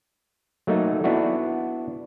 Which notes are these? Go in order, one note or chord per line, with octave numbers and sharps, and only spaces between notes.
F#3 A3 A#3 D#4
B3 D4 E4 F#4